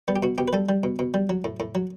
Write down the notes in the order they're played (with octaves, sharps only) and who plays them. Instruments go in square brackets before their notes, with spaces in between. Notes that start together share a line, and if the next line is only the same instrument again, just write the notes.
[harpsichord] G3 B3
G4
B2 F#4
B2 G4
B4
G3 A4
G3
B2
B2
G3
F#3
A2
A2
F#3